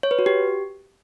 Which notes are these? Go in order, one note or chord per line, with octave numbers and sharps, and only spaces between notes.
C#5
B4
F#4
G4